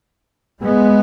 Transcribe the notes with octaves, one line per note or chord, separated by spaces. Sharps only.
G#3 B3